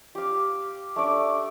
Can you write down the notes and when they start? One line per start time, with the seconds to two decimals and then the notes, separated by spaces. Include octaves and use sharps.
0.15 G4 F5
0.96 A3 D4 D5